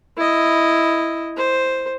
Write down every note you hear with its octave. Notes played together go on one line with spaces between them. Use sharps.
E4 D#5
C5